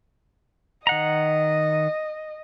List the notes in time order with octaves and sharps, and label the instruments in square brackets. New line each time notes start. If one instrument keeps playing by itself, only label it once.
[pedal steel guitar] D#3 F#5 A#5 [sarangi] D#5